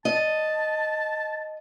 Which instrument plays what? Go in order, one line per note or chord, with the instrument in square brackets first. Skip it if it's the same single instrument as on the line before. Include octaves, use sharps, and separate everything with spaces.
[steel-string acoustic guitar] D#5 [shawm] A5